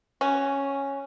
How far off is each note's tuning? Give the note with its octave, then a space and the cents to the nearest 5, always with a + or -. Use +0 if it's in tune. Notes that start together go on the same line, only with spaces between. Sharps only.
C#4 -5 F#4 +10